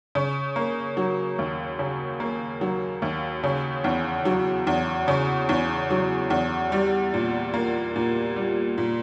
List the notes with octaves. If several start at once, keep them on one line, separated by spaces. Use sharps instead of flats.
C#3
A#3
F#3
D#2
C#3
A#3
F#3
D#2
C#3
E2
F#3
E2
C#3
E2
F#3
E2
G3
A#2
A#3
A#2
G3
A#2